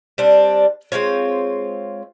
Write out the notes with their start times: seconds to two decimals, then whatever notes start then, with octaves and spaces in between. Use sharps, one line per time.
0.18 G3 C4 D4
0.92 G#3 C4 F4 C#5